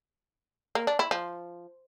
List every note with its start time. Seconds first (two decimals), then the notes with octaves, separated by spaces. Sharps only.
0.75 A#3
0.87 D4
0.99 E4
1.11 F3